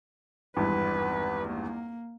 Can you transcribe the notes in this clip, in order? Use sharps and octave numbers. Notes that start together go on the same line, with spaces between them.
G#1 E2 G2 B4
A#3